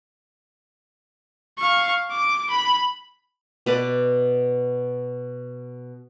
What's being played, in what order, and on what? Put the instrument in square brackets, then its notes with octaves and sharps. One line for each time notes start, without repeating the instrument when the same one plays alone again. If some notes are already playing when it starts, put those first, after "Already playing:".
[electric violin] F5 C#6
D6
B5
[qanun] B2 B4 D5